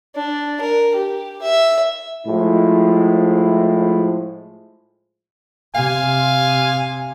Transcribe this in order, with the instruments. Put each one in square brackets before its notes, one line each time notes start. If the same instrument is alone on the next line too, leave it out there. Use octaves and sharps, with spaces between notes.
[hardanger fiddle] D4
A#4
G4
E5
[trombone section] A2 F3 G#3 E4
[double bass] C3 [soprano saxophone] F5 [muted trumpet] G#5